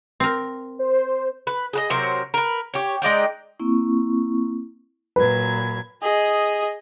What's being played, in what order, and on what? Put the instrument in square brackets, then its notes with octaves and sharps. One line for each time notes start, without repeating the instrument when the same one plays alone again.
[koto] C4 A#4
[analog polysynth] C5
[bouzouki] B4
G#4 B4 D#5
C3 F#3 A#4 C5
A#4 B4
G4 C#5
G#3 D#4 D5 G5
[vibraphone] A#3 C4 E4 C#6
[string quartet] A#2 F#3 G#6 [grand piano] B4
[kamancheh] G#4 D#5